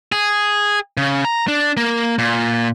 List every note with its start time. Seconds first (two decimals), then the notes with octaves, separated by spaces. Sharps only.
0.12 G#4
0.97 C#3
1.25 A#5
1.48 D4
1.77 A#3
2.18 A#2